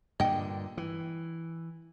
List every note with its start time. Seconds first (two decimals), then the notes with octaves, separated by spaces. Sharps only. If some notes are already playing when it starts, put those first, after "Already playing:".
0.20 G2 A#2 D3 D#5 G5
0.77 E3